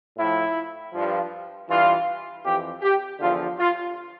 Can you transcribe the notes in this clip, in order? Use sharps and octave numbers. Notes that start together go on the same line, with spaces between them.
A2 F3 E4
G2 F3
G2 E3 F4
F2 E3 G4
G4
E2 D3 F3 F4
F4